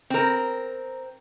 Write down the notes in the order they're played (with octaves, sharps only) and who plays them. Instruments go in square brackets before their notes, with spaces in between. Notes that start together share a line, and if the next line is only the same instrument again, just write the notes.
[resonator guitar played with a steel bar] C4 A#4